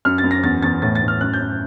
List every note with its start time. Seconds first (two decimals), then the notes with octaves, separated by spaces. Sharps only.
0.05 F#2 F6
0.18 A6
0.24 F#2
0.31 A#6
0.43 E2 A6
0.62 E2 A6
0.82 A2 A6
0.95 A6
1.02 A2
1.08 F6
1.21 F#2 F#6
1.34 G6
1.40 F#2